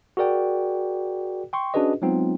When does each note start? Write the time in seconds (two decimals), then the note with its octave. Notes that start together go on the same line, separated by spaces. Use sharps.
0.17 F#4 G#4 A#4 D5 G5
1.53 G5 C6 C#6
1.74 C#4 D4 F#4 G#4 B4 D#5
2.02 F#3 G#3 B3 C4 D#4 F4